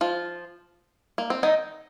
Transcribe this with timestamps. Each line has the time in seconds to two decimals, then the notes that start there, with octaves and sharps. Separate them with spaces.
0.01 F3 F4
1.18 A#3
1.30 C4
1.43 D#3 D#4